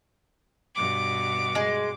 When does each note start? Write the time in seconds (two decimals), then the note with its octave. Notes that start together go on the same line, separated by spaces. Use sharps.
0.74 G2 B2 D6
1.55 G#3